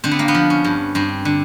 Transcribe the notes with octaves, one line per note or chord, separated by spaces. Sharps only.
D3 C4
B3
A#3
B3
F3
C#4
G2
G2 C4
D3